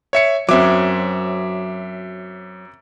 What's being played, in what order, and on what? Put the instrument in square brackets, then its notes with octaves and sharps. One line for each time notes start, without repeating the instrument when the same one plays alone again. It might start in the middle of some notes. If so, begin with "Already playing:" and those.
[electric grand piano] C#5 E5 C#7
[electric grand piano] F#2 E5 D6 [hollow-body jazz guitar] F#3 C4